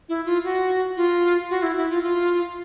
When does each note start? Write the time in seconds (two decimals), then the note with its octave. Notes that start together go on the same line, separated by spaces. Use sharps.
0.09 E4
0.26 F4
0.44 F#4
0.97 F4
1.50 F#4
1.63 E4
1.77 E4
1.90 F4
2.03 F4